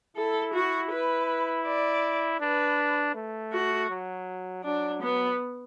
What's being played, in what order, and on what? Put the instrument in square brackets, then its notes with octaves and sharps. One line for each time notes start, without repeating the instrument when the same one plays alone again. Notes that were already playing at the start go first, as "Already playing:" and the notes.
[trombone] E4 [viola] A4
[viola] F#4
B4
D5
[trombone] D4 [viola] B4
[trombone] A3
[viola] F#4
[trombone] F#3
[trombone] F#3 [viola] D4
[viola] B3